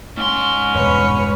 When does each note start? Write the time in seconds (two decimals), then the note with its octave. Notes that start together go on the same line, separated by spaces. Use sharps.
0.18 G#2 C#4 C6
0.75 E2 G2 B2 B4 C#5